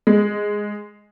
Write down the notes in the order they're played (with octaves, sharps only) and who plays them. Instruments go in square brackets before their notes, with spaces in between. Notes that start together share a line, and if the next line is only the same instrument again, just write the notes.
[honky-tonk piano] G#3